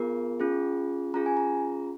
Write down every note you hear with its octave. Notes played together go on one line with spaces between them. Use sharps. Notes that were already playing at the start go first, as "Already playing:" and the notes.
Already playing: B3 F4 G#4 A#4
C#4 F4 G#4
C#4 F4 G#4 A#5
G#5
A#5